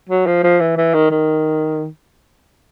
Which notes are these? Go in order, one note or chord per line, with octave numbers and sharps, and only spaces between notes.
F#3
F3
F3
E3
E3
D#3
D#3